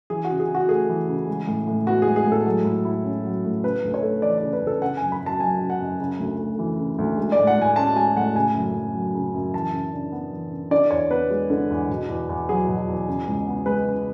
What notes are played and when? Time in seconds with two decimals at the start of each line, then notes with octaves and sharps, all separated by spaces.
0.10 E3 G#4
0.24 F#4
0.30 C#3
0.40 G#4
0.50 E4 F#4
0.68 A3 G#4
0.89 E3
1.08 C#3
1.28 G#3
1.47 A2
1.68 A2
1.87 B3 F#4
2.02 G#3 G#4
2.16 G#4
2.27 A2
2.32 A4
2.46 F#3
2.65 A2
2.85 E4
3.04 C#4
3.24 F#3
3.45 A2
3.64 C#3 B4
3.84 D2
3.94 C#5
4.03 A3
4.22 E3 D5
4.38 C#3 D5
4.53 B4
4.63 D2 A4
4.82 C#3 F#5
4.97 F#2 G#5
5.12 B5
5.22 F#2 A5
5.40 F#3 G#5
5.61 C#3
5.70 F#5
5.80 F#2
6.00 C#3
6.19 D2
6.38 A3
6.59 E3
6.78 C#3
6.98 D2
7.17 G#3
7.32 D5
7.38 A2
7.47 F#5
7.57 A2 G#5
7.76 C#4 A5
7.96 G#3 G#5
8.16 A2 F#5
8.36 C#3 G#5
8.55 F#2
8.74 F#2
8.94 F#3
9.15 C#3
9.34 F#2
9.54 E3 A5
9.73 C#3
9.93 D4
10.12 B3
10.32 E3
10.52 C#3
10.71 D3 D5
10.91 E2 C#5
11.10 B3 B4
11.30 G#3
11.50 D3
11.70 E2
11.89 B2
12.09 E2
12.29 E2
12.49 F#3 G#4
12.68 B2
12.88 E2
13.08 C#3
13.28 C#2
13.47 B3
13.66 G#3 B4
13.85 C#3